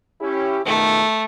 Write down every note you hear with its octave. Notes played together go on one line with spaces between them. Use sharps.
C#4 E4 G4
C#2 B2 D#3 A3